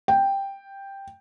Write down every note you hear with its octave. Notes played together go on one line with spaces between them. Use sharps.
G5